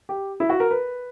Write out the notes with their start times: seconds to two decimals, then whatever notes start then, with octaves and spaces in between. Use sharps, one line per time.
0.09 G4
0.40 E4
0.49 F#4
0.60 A#4
0.71 B4